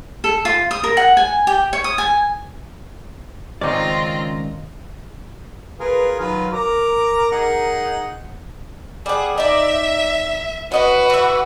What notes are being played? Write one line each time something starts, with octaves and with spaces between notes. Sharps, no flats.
A4
F4
D#6
A#4
F#5
G#5
G4
C#5
D#6
G#5
C#2 D#3 C4 C#4 D#4 F4 D5 A#5
F4 G#4 A#4 B4
D#3 F#3 F4 B4
A#4 A#5 D6
D#4 G#4 F#5
G3 G#4 F#5
D#4 D5 E5
C#4 F#4 B4 D#5 F#5
E3 E5